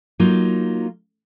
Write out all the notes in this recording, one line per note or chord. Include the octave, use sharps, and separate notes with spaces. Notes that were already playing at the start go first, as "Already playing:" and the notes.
F#3 A#3 D#4 F4